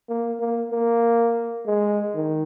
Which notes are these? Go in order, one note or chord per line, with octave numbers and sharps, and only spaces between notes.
A#3
A#3
A#3
G#3
D#3